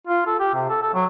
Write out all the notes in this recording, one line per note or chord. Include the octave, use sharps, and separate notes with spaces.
F4
A4
G4
C3
A4
A4
F#3